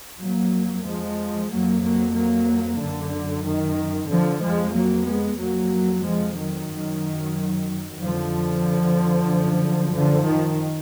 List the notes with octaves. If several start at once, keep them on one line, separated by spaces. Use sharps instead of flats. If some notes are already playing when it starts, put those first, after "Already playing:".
F2 F#3 A#3
F3 G#3
F2 F#3 A#3
F#3 A#3
F#3 A#3
F#2 D3
D#3
F2 D3 F3
F3 G#3
F#3 A#3
G#3 B3
F2 F#3 A#3
F3 G#3
D#3 F#3
F#2
F2 D3 F3
F#2
D3 F3
D#3